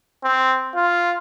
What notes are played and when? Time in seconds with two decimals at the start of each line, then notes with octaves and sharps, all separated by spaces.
0.23 C4
0.75 F4